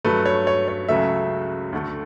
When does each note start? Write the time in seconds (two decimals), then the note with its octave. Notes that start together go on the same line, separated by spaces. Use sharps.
0.04 G2 F#3 A3 B4
0.26 C#5
0.47 C#5
0.68 C#5
0.89 C#2 C#3 F#3 A3 E5
1.73 D2 D3 A3